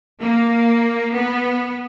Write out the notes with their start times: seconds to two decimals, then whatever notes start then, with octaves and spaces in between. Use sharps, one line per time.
0.21 A#3
1.14 B3